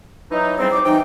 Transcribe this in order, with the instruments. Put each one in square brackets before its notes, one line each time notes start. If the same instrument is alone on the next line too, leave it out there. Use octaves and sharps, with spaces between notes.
[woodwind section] E3 F#3 D#4
[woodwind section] C#3 G3 C4 [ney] C5
[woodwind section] F#3 D#4 D6
[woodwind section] C3 E3 G5 [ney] D#4